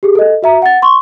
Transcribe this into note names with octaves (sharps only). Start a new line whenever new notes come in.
G4 G#4
A4 D#5
F#4 E5 A#5
F#5 A6
C6 C#6